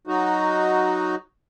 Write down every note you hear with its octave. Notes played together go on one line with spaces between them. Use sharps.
F#3 D#4 F#4